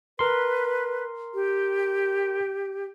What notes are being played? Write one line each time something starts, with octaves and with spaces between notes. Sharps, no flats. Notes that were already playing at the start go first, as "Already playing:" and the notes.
A#4 B4 C6
G4